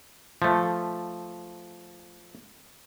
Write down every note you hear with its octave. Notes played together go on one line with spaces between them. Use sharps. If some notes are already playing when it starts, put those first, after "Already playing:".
F3 A3